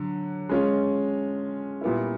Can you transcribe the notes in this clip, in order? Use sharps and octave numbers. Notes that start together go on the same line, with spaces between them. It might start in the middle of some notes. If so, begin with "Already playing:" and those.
Already playing: D3 F#3
G#3 C#4 F4
A#2 G3 B3 E4